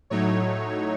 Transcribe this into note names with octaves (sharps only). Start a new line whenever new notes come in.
A2 F#3 A3 D#4 C#5